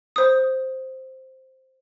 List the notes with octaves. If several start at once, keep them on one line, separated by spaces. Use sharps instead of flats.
C5 D#6